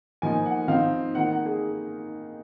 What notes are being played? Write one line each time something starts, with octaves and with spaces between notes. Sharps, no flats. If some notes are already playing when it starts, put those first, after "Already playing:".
F3 A#3 D#4 G#5
F#5
F3 C4 D#4 F5
D#3 A#3 D#4 F#5
F#5
G#4